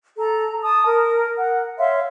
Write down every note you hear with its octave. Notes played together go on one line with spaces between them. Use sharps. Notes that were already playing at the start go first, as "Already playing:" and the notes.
A4 A#5
A5 D#6
A#4
F#5
C#5 E5 F5 C6